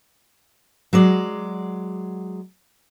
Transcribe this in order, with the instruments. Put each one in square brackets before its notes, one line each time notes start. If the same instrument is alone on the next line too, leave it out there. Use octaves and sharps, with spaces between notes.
[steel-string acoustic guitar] F#3 G#3 D5